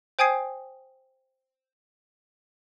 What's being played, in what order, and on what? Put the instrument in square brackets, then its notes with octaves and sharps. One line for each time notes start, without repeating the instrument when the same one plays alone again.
[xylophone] C5 G5 G#5 D#6 G#6 C7